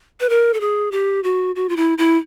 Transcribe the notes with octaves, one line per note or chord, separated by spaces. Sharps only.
B4
A#4
A4
G#4
G4
F#4
F#4
F4
E4
E4